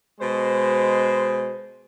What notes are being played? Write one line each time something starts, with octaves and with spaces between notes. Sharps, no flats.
B2 G#3 C5